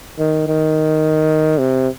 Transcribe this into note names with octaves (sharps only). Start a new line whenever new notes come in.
D#3
D#3
C3